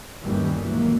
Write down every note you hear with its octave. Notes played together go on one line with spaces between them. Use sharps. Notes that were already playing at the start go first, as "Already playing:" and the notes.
G1 D#2 D#3 E3 G3 C#4
C#2 A#2 E3 F#3 A#3